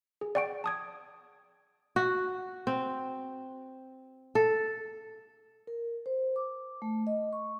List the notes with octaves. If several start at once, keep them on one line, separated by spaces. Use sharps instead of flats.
G#4
D5 F#5 G5 C#6 D7
A5 D#6 G#6
F#4
C4
A4
A#4
C5
D6
A3
D#5
C#6